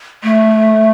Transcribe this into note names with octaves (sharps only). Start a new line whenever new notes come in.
A3